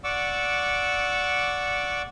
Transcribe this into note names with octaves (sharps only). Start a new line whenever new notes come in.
D5 F#5 C#6 D6 E6